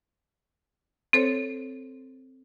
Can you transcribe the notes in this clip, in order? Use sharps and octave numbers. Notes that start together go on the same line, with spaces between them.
C4 A4 C5 C#5